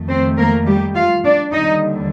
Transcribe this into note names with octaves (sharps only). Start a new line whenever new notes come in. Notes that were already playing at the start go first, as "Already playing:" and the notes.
Already playing: F2 D#3 A3
C4 C5
A#3 A#4
G3 G4
F4 F5
D4 D5
D#2 D3 G3 D#4 D#5